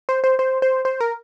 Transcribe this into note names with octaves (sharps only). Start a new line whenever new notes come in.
C5
C5
C5
C5
C5
A#4